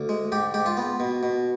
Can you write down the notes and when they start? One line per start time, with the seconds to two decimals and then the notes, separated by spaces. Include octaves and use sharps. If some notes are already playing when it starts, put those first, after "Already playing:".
Already playing: D2
0.09 G#3
0.32 G#2 G4
0.54 G#2 G4
0.66 F4
0.77 B3
1.00 B2
1.23 B2